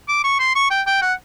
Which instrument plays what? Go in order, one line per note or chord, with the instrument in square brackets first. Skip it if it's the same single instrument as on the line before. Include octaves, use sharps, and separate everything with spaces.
[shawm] D6
C#6
C6
C#6
G5
G5
F#5